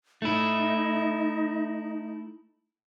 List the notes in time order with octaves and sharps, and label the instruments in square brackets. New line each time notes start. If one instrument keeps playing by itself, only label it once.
[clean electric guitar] A3 E4 [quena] D#4